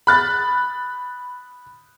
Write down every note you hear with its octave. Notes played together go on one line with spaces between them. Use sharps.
B5 F#6 A6